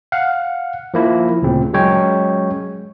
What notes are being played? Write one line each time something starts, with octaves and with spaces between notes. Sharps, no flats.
F5 F#5
F3 A#3 E4
D2 A#2 C#3 C4
F#3 G#3 C#4 C#5 G5